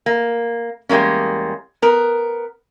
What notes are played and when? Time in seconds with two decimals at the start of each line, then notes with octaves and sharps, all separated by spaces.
0.06 A#3
0.89 E2 G3 G#3 A#3 C#4
1.82 B3 A#4